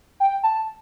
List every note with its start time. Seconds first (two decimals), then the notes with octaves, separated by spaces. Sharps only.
0.20 G5
0.43 A5